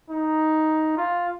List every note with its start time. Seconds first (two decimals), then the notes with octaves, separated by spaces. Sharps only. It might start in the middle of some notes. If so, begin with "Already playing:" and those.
0.10 D#4
0.97 F4